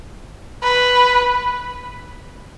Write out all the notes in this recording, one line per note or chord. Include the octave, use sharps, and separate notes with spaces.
B4